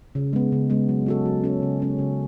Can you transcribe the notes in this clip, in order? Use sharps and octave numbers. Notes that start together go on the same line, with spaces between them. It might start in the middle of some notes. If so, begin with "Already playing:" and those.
C#3
G#3 B3
C#3
G#3 B3
F#3
C#4 F#4 A4
F#3
C#4 F#4 A4
C#3
G#3 C#4 F#4
C#3